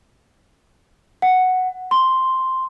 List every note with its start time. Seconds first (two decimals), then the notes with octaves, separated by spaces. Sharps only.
1.22 F#5
1.91 C6